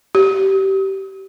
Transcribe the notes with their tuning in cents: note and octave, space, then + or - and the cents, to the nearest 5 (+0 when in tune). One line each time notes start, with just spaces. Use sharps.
G4 -25